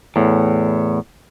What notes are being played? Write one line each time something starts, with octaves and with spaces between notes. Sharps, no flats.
E2 A2